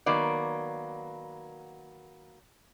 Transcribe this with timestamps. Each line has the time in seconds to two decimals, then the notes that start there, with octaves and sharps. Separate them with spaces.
0.06 D#3 F#3 A#3 B3 D5